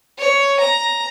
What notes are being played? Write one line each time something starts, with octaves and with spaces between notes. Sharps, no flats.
C#5
A#5